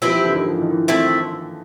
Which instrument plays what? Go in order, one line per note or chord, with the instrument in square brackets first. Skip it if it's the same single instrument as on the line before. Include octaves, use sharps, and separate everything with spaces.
[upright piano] F3 [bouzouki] C4 E4 G4 B4
[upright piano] E3
D3
D#3
F3
E3
D#3
E3
[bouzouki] A3 C4 E4